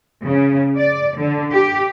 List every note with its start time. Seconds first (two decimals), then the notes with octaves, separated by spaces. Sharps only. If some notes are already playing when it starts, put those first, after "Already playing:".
0.23 C#3
0.76 D5
1.16 D3
1.52 G4